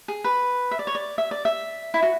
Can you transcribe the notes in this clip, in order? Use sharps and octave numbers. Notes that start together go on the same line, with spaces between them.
G#4
B4
E5
D5
C#5
D5
E5
D5
E5
E4
F#4